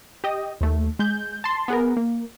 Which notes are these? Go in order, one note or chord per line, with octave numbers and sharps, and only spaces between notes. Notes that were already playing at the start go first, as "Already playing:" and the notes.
G4 D#5
D#2 A3
G#3 G6
A5 C6
B3 G#4 A#4
A#3